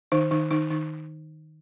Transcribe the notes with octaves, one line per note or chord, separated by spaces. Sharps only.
D#3 D#4
D#3 D#4
D#3 D#4
D#3 D#4